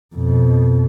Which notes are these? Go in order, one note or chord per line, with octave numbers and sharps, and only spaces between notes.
F2 B2